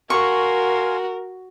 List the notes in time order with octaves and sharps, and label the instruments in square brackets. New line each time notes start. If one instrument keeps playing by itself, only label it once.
[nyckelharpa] F#4 [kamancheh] A#4 [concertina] F5 G#5 C6 [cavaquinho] C#6